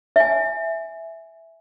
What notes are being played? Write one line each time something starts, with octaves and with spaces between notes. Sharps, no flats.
E5 G#5